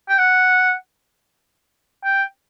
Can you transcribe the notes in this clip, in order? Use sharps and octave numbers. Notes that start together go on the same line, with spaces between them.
G5
F#5
G5